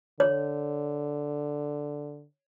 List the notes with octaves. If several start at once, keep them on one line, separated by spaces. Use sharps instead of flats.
D3 C#5